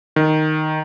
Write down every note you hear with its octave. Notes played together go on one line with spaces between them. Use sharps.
D#3